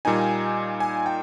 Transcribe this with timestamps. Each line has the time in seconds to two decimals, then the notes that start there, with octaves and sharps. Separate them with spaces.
0.05 A#2 G3 A#3 D#4 G#5
0.80 G#5
1.06 G5